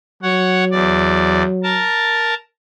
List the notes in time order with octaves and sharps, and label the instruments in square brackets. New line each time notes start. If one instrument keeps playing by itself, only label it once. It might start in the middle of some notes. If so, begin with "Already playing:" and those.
[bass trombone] F#3 [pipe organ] C#5 F#5
[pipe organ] E2 D5
A#4 A5